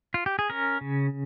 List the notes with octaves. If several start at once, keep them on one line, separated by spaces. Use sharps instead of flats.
F4
G4
G#4
C#4 A#4
C#3